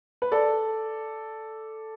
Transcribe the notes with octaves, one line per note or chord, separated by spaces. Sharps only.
B4
A4 D5